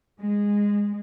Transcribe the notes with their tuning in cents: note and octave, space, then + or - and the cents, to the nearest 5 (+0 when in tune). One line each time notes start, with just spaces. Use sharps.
G#3 -15